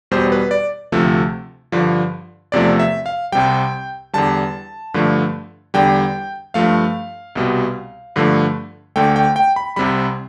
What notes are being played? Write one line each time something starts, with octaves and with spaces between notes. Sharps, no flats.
E2 B2 G3 C5
B4
D5
D2 C3 F3 A3
G2 D3 F3
E2 C3 F3 A3 D5
E5
F5
C2 C3 G3 G5
E2 D3 G3 A5
G2 D3 F3 A3
E2 D3 G3 G5
G2 F3 A3 F5
C2 B2 G3
G2 D3 F3 A3
D2 D3 A3 G5
G5
G5
B5
C2 C3 G3 B5